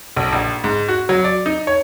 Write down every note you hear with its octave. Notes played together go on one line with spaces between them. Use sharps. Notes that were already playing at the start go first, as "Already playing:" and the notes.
B1
A#1
G#2
F#4
F#3
D5
D#4
C#5